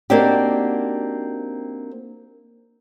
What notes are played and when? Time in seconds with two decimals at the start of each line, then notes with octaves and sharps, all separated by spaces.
0.10 A#3 C4 D4 D#4 F#4 G4